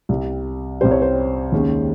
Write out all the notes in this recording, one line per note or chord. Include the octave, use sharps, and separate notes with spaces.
C2 C3 G3
C2 C3 G3 C5
C#5
C5
D#2 C#3 G#3 C#4